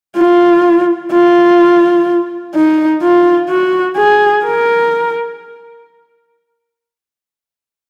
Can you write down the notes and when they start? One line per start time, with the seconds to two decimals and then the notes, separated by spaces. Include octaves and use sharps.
0.17 F4
1.12 F4
2.55 D#4
3.02 F4
3.49 F#4
3.97 G#4
4.45 A#4